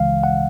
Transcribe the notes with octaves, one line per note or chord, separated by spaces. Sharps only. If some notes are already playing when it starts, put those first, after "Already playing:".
Already playing: C#2 C#3 E3 G#3 F5
F#5